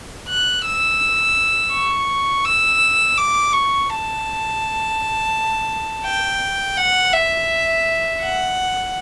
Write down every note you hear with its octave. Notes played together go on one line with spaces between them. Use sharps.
F#6
E6
C#6
E6
D6
C#6
A5
G5
F#5
E5
F#5